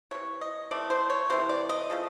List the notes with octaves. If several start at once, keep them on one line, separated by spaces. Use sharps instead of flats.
C3 E3 A3 C#5
D#5
C3 E3 A3 D5
C5
C#5
C3 E3 A3 C5
D5
D#5
C#3 F3 A3